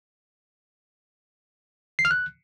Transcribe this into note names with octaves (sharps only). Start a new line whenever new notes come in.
C7
F6
F#6